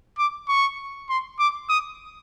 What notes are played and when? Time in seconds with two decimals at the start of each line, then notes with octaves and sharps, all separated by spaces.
0.18 D6
0.49 C#6
1.09 C6
1.39 D6
1.69 D#6